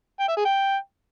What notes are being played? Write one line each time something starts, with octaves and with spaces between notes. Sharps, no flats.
G5
E5
G#4
G5